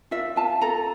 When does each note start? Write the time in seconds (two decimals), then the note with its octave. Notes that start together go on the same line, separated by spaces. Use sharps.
0.11 F4 E5
0.36 F4 A5
0.62 A4 A#5